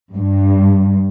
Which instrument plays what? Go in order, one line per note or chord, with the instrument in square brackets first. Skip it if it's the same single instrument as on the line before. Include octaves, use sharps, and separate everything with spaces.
[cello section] G2